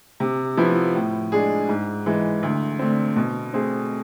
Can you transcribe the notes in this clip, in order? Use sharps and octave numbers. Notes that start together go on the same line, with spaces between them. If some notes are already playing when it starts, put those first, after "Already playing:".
C3
F3 B3 E4
A2
G#3 D4 G#4
G#2
E3 G#3
D2
D3 A3 C4
B2
A3 C4 G#4